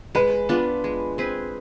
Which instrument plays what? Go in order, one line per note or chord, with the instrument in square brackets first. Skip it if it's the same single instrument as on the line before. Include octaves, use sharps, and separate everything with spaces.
[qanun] G#3 [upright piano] B4
[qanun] B3 D4 F4
G#3
C4 G#4 B4